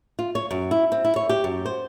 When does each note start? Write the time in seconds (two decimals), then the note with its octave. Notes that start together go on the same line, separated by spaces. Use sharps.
0.19 F4
0.35 C#5
0.51 F#2
0.71 E4
0.92 C4
1.04 E4
1.16 C#5
1.29 G4
1.44 F#2
1.66 C5